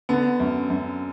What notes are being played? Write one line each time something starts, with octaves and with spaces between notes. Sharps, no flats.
D3 B3
F#2
F#2